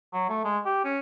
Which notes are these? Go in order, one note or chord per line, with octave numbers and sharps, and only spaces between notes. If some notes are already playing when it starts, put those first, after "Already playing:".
F#3
A3
G#3
G4
C#4